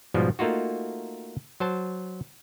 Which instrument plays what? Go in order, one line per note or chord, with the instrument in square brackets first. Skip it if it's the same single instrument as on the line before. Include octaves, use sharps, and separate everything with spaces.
[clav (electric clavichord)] G#2 B2 F3 G3
A3 A#3 D#4 F4 F#4
F#3 C5 A5